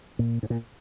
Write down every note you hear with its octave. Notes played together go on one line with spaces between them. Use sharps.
A#2
G#2
A#2